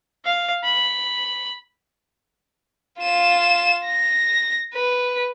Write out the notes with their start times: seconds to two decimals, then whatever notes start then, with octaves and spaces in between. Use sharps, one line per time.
0.25 F5
0.64 B5
3.01 F4 E7
3.85 A#6
4.75 B4